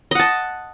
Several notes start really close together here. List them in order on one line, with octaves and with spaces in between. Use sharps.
D#5 F#5 A5